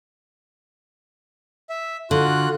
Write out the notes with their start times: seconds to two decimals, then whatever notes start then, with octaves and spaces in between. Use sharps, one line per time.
1.70 E5
2.11 D3 F4 F#4 F#6